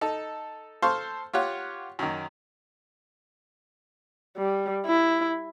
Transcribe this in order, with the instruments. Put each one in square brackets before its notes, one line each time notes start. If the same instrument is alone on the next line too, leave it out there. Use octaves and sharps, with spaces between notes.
[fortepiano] D#4 A4
A4 C5 F5 C6 C#6
F4 G4 C#5 F#5
F#2 D#3
[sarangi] G3
E4